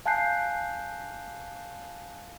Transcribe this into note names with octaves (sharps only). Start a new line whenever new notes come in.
F5 G#5 A5 F#6 G6 C7